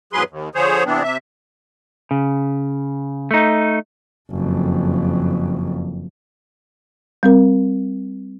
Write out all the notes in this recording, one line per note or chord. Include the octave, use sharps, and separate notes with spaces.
E2 G#2 F#3 G#4 B4 C6
D#2
D3 F3 G#4 C5 C#5
C3 E3 B3 C4 D4
C3 E5
C#3
A3 D#4
F#1 F2
G3 C4 A#4